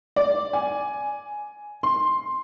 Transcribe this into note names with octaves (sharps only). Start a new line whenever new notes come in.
D5
G#5
C6